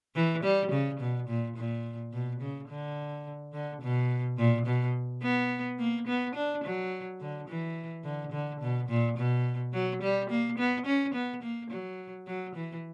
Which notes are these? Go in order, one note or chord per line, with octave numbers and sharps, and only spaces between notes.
E3
G3
C#3
B2
A#2
A#2
B2
C#3
D3
D3
B2
A#2
B2
B3
A#3
B3
D4
F#3
D3
E3
D3
D3
B2
A#2
B2
F#3
G3
A#3
B3
C#4
B3
A#3
F#3
F#3
E3